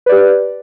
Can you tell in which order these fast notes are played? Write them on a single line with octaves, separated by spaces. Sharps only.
B4 D5 G4